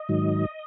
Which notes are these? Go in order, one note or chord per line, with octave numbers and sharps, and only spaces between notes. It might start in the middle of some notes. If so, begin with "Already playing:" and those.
Already playing: D#5
G#2 D#3 F#3